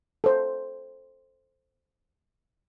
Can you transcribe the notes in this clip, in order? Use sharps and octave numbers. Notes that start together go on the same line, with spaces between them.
A4 C5